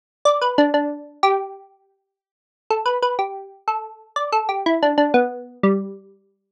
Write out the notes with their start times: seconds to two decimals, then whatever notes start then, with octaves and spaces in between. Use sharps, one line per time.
0.25 D5
0.41 B4
0.58 D4
0.74 D4
1.23 G4
2.70 A4
2.86 B4
3.02 B4
3.19 G4
3.68 A4
4.16 D5
4.32 A4
4.49 G4
4.66 E4
4.83 D4
4.98 D4
5.14 B3
5.63 G3